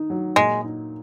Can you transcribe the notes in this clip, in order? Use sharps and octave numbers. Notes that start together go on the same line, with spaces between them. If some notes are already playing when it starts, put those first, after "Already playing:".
Already playing: D#3 D#4
F#3
A#2 G#3
D#4